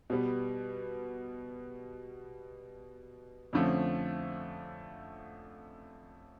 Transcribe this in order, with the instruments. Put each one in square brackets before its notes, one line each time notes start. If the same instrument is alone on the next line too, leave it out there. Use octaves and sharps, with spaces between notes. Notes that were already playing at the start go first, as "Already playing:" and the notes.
[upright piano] B2 G3 B3
F2 D3 F3 A3 C#4